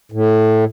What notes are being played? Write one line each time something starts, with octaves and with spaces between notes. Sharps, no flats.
A2